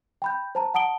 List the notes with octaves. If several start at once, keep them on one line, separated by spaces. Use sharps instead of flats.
G5 B5 G6
C5 A5 A#5
F#5 A5 D#6 D7 G7